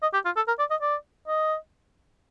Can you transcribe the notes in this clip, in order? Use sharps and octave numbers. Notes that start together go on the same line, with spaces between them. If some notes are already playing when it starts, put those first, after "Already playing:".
D#5
G4
F4
A4
A#4
D5
D#5
D5
D#5